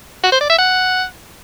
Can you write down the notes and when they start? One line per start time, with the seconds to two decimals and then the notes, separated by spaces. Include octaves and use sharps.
0.23 F#4
0.32 C5
0.41 D5
0.50 E5
0.58 F#5